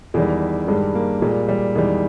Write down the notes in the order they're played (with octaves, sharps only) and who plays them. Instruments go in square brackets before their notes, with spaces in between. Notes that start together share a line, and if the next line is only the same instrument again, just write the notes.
[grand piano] E2 D#3 G3 G#3
G2 D#3 G3 G#3
A#3
A#2 G3 G#3
G3
E2 D#3 G3 G#3